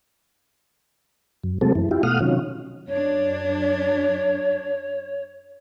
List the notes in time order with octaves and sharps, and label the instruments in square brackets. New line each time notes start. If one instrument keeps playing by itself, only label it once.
[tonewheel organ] F#2
C3 F#3 G#3 A3 C4 A4
F#2 E3
E4 F4 G4
B2 A3 F5 F#5 D#6 F6
C3 D#3 F#3 C#4 F4
[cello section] F#2 D4 [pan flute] C#5